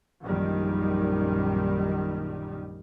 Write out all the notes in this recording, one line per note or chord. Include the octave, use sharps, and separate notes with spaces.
A#1 F#2 D#3 G3